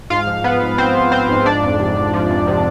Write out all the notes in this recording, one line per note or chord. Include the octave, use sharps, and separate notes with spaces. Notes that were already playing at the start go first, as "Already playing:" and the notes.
G#2 F4 F5
F3
F3 B3 B4
G#2
G#2 C4 C5
F3
F3 C4 C5
G#2
F3 D4 D5
F2
C3
F2
F3
F2
C3